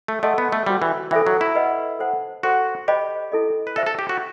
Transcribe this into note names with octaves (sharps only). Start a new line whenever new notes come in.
A3
A3 A4 D#5 F#5 A5 C6
B3
A3
G3 F#4 C5 F#5 C6
E3
E3 A4 C5 E5 G5
F#3
E4
B4 D#5 F#5
A4 C5 F#5 A5
F#4 A4 C5 F#5 C6
G4 C5 D#5 G5 B5
E4 A4 D#5
B4
A4 C5 E5 A5
A4
G4
F#4